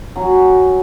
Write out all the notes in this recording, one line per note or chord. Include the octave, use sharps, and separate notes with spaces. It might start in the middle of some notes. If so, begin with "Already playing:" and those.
F#3 C#4